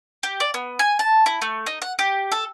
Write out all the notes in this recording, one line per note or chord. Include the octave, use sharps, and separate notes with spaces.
G4
D5
B3
G#5
A5
E4
A3
D#4
F#5
G4
A4